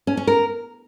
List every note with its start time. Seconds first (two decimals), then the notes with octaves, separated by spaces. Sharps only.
0.07 C#4
0.17 C#4
0.27 A#4